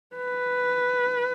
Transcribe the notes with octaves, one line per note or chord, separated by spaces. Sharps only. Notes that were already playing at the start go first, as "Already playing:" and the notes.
B4